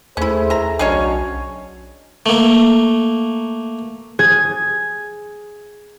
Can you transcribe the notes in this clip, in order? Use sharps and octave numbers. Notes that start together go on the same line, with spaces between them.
D#2 A3 C#4 E4 G#4 C5
E5 A#5
B1 C#3 F#3 G#3 C#4 D4 C#5
A3 A#3
G#4 G#6